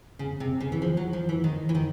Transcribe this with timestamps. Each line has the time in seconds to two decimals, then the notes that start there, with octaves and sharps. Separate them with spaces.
0.19 C#3
0.40 C3
0.60 C#3
0.72 E3
0.82 F3
0.97 F#3
1.13 F3
1.29 E3
1.44 D#3
1.69 E3
1.75 D#3